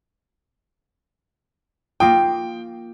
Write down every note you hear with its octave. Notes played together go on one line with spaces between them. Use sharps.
A#3 F4 G5 D#6